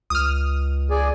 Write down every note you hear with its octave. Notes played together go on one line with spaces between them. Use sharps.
C#2 D#6 F6
G#4 D5 G#5